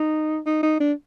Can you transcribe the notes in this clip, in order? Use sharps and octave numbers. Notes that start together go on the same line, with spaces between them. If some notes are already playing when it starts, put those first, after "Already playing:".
Already playing: D#4
D#4
D#4
D4